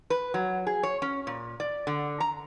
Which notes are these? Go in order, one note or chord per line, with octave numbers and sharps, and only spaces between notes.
B4
F#3
G#4
C#5
C#4
A#2
D5
D3
A#5